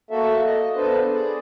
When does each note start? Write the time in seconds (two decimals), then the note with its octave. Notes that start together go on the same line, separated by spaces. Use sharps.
0.11 A#3 F#4 A4 E5
0.45 D#5
0.76 B3 D4 A4 B4 C5
1.13 G#4 D5